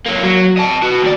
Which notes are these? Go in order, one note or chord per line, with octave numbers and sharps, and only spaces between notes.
F#3 A#3
F#3
D#5 A5
B3 F#4
D#2 D5